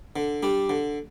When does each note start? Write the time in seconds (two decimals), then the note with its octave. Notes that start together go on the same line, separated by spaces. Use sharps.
0.16 D3
0.43 G3 D4
0.69 D3